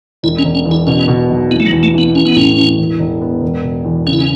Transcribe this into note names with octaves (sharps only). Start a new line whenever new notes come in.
E1 E4
C#4
E1
C#4
E2
E4
B2 C#4
B2
B1
E3 B3
A3
F#3
E2
A3
E3 B3
E3 C#4
B3
A2 C#4
E3
E1
E1
B3
E1
B2
E2
C#3 C#4
E4
C#4